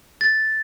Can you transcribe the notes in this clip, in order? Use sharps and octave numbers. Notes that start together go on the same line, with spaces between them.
A6